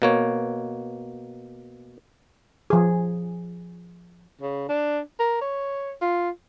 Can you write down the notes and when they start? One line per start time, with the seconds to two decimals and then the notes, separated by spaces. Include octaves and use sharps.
0.02 B2 A#3 C#5
2.70 F3 G#4
4.41 C#3
4.69 D4
5.19 A#4
5.41 C#5
6.01 F4